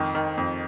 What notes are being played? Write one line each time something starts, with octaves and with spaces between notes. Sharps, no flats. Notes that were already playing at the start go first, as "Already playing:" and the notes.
Already playing: F2 D#3
D#3
F2